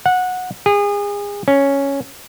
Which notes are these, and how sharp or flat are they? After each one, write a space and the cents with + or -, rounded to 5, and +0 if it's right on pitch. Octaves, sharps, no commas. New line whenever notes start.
F#5 -15
G#4 -30
C#4 +0